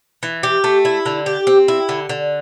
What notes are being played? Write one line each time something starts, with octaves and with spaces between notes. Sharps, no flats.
E3
G4
A3
E4
D3
G4
C4
E4
D3
D3